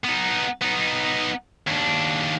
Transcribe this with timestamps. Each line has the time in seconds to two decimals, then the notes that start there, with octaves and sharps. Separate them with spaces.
0.05 B3 D#4
0.62 B3 D#4
1.67 D#2 D4